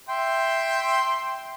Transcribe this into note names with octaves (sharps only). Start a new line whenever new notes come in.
E5 G5 C6